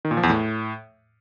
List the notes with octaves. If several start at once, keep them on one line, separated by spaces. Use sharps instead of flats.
D#3
A#2
F3
E2
A2